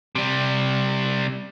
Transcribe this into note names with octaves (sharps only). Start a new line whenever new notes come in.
C3 G3